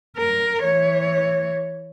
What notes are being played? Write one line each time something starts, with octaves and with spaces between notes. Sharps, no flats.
A#4
E3 C#5